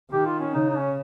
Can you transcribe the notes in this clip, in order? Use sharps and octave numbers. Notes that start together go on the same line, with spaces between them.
D#3 G4
F4
C#4
C#3 D#4
D#4
C#4